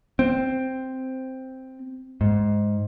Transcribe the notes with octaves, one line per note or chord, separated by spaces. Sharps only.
C4
G#2